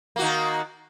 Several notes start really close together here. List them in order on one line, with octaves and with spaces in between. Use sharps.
A#3 F#4 D#3